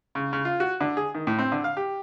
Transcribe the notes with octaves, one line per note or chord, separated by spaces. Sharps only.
C#3
C#3
F4
F#4
D3
G#4
D#3
A2
C4
D3
F5
G4